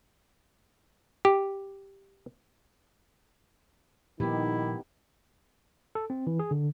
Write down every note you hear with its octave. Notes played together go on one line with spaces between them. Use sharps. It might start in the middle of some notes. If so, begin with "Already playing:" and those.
G4
A#2 D#3 F3 G3 B3 D#4 E4 G4
A4
C4
E3
G#4
D3